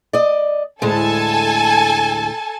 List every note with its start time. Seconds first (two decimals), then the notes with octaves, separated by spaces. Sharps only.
0.13 D5 D#5
0.82 D2 A2 G#3 A4 G#5 A5